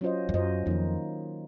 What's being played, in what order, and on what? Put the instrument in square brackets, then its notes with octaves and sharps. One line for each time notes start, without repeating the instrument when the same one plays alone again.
[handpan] F#3 C#4 F4 C5 D#5
[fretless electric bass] F2
[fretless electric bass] F#2 [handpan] F#3 C#4 F4 C5 D#5
[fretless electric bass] F2 [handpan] D#3 A#3 D#4